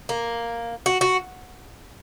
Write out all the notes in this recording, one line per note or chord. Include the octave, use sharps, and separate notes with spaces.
A#3
F#4
F#4